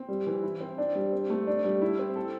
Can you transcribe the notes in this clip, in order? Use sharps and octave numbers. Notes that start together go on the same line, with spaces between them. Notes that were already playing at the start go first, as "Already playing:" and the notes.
Already playing: C4
G3
E3
E4
C4
D4
G3
C4
A3
D4
G3
E4
C4
A4